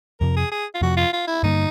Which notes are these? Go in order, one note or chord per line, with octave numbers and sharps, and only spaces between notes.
F2 C3 F3 A#4
G#4
G#4
F4
F2 C3 F3 F#4
F4
F4
E4
G2 D3 G3 A#3 D#4